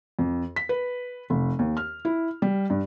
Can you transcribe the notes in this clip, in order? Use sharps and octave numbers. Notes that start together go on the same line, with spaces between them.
F2
B6
B4
F1
D#2
F6
E4
G3
G2